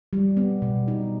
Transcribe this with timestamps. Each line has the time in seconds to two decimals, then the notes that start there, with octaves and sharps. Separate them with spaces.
0.13 G3
0.37 B3
0.62 B2
0.88 D#4